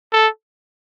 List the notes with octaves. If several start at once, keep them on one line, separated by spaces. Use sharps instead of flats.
A4